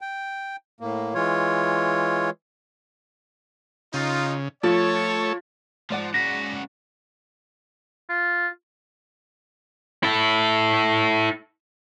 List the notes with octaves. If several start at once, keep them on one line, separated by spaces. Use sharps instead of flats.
G5
A2 A#3
E3 G#3 F4 C#5
C#3 D#4 F4
F3 A3 A4 C#5
G#2 F3 D5 F#5
C#3 F#4 A#6 B6
F4
E4 A4